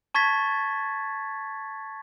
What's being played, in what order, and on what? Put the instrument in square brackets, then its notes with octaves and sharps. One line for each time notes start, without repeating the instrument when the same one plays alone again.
[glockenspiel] A5 C#6 G#6 A6 B6